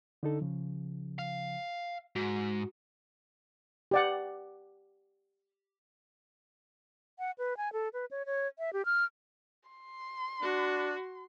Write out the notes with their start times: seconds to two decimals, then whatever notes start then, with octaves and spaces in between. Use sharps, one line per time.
0.23 D3 D#4 A4
0.41 C#3 F3
1.19 F5
2.16 G#2 F#4
3.91 G4 D5 F#5
7.19 F#5
7.38 B4
7.57 G#5
7.73 A4
7.93 B4
8.11 C#5
8.26 C#5
8.59 E5
8.73 G4
8.85 F6
9.69 C6
10.42 D4 F#4